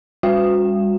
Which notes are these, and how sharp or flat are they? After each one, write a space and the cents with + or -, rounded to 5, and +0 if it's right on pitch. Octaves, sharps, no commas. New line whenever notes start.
G3 +40 F#4 -25 G5 +0